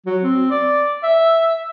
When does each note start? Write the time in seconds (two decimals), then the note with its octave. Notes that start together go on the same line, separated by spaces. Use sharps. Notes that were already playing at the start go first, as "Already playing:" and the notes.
0.06 F#3
0.23 C4
0.51 D5
1.03 E5